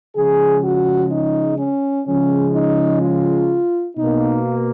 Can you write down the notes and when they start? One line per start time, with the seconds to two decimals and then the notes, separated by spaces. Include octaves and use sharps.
0.16 C#3 F3 G#3 G#4
0.63 F#4
1.11 D#4
1.58 C#4
2.06 C#3 F3 G#3 C#4
2.54 D#4
3.02 F4
3.96 B2 A#3 D#4